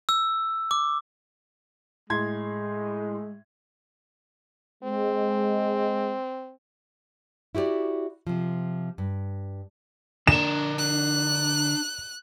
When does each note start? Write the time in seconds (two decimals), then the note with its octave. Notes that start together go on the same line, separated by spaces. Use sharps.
0.09 E6
0.71 D6
2.10 A2 G#3 C6 G#6
4.84 G#3 C4
7.55 E4 F#4 G4 A#4 D5
8.27 C3 F3
8.98 G2
10.27 D3 D4 A#4 E7
10.78 F#6